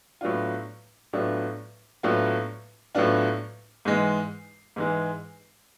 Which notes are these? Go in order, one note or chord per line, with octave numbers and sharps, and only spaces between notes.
A2 F#3 B3 D4 F4
A2 F#3 B3 D4 F4
A2 F#3 B3 D4 F4
A2 F#3 B3 D4 F4
G#2 E3 G#3
G#2 E3 G#3